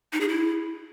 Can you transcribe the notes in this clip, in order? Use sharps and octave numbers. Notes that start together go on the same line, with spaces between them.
D#4
G#4
E4